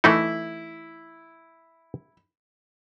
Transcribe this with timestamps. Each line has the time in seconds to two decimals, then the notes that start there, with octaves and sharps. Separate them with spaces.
0.04 E3 A3 D#4 E4